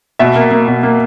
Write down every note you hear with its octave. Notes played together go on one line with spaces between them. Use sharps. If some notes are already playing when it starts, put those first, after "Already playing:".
B2 E5
A#3
A#3
B2
A#3